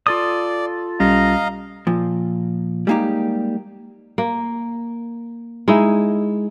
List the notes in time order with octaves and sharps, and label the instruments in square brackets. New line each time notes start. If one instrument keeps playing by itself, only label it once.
[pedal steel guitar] F4 A4 D#6 [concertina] D5
[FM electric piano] B1 G3 C#4 [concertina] D#5 F5 A#5
[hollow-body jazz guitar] A#2 F3
G3 G#3 A#3 D#4 G4
[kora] A#3
G#3 D#4 E4